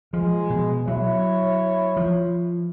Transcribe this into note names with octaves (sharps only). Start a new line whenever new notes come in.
F3 G#3
B2
F#3 E4 C#5
F3